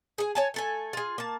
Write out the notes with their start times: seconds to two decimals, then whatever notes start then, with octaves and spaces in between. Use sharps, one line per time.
0.18 G#4 G#5
0.35 C#5 G#5 A5
0.54 A3 A4 G#5
0.93 F4 G#4
1.18 A#3 A5